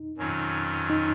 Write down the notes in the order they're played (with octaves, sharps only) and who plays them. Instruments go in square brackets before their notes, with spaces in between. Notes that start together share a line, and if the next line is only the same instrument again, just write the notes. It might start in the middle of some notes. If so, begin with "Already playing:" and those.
Already playing: [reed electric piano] D#4
[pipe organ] F2 D#3 F#3 C#4 F4
[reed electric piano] D#4